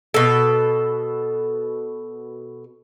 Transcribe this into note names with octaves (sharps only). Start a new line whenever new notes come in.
B2 A4